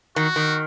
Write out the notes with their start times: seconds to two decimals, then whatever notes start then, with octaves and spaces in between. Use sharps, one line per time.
0.16 D#3 F#4
0.36 D#3